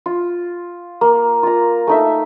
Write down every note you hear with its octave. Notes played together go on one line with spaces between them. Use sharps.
F4
A#3
F4 A#5
A3 D#4 E5